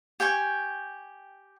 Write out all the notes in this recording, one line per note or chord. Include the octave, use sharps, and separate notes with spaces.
G4 G5 G#5 C#6